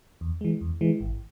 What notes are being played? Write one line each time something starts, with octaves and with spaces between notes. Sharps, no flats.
E2
E3 G#3
E2
E3 G#3
G#1